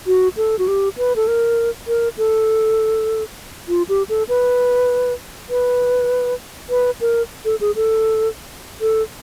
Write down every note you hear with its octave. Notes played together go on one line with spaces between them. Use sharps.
F#4
A4
F#4
G4
B4
A4
A#4
A#4
A4
F4
G4
A4
B4
B4
B4
A#4
A4
G#4
A4
A4